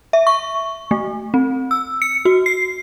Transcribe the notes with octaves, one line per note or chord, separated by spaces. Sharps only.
E5
C#6
A3
C4
E6
C#7
F#4
C7